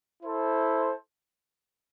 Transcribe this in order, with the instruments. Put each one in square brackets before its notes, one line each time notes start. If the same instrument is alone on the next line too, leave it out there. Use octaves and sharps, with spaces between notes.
[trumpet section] E4 A4 C5